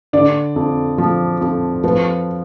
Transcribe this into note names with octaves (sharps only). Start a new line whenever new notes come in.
D3 D5
F2
F3
F2
F3 B4